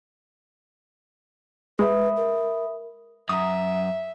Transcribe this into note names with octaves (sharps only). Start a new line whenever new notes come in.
G#3 B4 E5 B5 D#6
A#4
F#2 E5 A#5 D#6